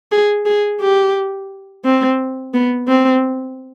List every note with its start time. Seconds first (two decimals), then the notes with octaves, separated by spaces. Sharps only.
0.12 G#4
0.46 G#4
0.81 G4
1.85 C4
2.54 B3
2.88 C4